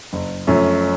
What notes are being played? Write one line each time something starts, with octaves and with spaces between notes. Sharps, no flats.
F#1
F#2 F3 A3 C#4